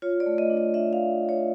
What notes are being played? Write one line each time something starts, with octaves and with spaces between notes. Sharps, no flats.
F4 C#5
D5
A3
D#5
D4
D#5
D4 E5
F5
A3
A3
C#5